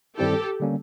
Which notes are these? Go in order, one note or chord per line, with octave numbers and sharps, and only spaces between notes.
G2 D#3 G3 C4 E4 G4 A4
D3 G3 A#3 C#4